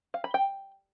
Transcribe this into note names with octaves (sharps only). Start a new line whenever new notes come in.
F5
B5
G5